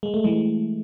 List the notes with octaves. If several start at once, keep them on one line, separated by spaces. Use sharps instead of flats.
G#3
A3
E3 G#3